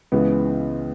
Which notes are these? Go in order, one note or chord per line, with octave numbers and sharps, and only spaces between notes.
C#2 C#3 E3 B3